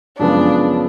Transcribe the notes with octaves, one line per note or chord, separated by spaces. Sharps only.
F#2 C#3 F3 G#3 B3 D4